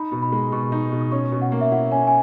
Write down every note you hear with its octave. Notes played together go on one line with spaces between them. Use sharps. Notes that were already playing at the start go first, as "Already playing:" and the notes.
Already playing: D#4 B5
B2
B5
G#3
B2 C#6
D#4
B2
D#6
C#4 C#6
B2
F#5
A#3
E5
E4 F#5
C#4 G#5
G#5